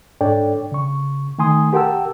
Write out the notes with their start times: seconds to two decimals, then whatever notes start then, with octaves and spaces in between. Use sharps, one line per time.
0.21 G#2 D4 A4 C#5 D5 G5
0.72 C#3 C#6
1.39 D#3 A3 G#5 C6 D#6
1.73 G4 A#4 F#5 G5 A5 E6